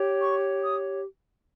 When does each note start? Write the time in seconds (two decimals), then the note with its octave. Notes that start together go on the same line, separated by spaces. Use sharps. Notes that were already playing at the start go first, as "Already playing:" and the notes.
Already playing: G4 C#5
0.21 C#6
0.62 D#6